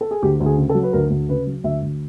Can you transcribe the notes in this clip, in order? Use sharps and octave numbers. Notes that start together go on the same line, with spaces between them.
A4
G#4
D2 G4
D2
G#4
C#3
A4
F#3
B4
D2 A#4
D2
C#3 B4
F#3
D2 E5
D2